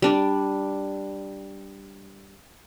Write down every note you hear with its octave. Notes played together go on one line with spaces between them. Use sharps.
G3 D4 D5